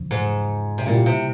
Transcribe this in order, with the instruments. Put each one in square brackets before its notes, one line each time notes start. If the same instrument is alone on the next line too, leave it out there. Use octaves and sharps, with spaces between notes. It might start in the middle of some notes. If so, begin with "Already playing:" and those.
Already playing: [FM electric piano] E2 C#3 F3
[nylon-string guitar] G#2
C3
[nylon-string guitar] A#2 [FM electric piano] C#3 G3 A#3 E4 G4
[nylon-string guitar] C3